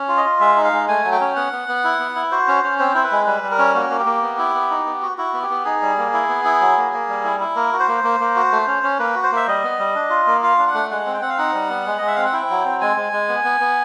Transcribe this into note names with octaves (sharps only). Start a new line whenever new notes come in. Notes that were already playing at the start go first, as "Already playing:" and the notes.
Already playing: C#4
F4
D#5
F4
G#3 E5
D#4
F5
G#3
A3 G#5
F#3
G5
C#4
B3 F#5
B3
B3
E4
B3
E4
F#4 C5
C#4
C#4
C4 C5
E4 C5
B4
G#3
G3 B4
G3
A#4
C#4
A#3 F#4
A#3
G4
A#3
B3
E4
B3
D#4
B3
F#4
E4 F#4
B3
G4
B3
D#4 G#4
G3
A#3
E4
B3
E4
F#3
A#3
A#3
G3
E4
E4
A#3 A#4
F#4
C5
A#3
A#3
A#3
F#4
A3
C#4
C#4
A#3 B4
F#4
C5
A#3 E5
G3 D#5
B3
G3
D4
F4
A#3
F4 F5
D4
F#5
A3
G#3 F#5
C4
G5
C4 F#5
F5
D#4 F#5
G3
B3
G#3
G#3 D#5
E5
C4 F5
F#5
E4 G5
F#3
C4
G#3 G#5
G#3
G#3
B3
B3
B3